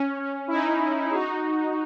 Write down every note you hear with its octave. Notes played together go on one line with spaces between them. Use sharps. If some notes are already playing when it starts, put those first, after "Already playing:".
Already playing: C#4
C#4
E4
D#4
G#4
D#4 F#4